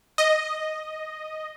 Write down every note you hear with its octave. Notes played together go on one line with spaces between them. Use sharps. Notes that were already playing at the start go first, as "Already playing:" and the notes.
D#5